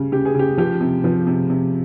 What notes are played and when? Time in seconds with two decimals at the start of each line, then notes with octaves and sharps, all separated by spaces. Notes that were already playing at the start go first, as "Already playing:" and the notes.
Already playing: C#3 G3
0.12 C#3 G4
0.25 G#4
0.35 C#3 G4
0.58 F3 G4
0.81 C3
1.04 F3
1.27 C3
1.50 C3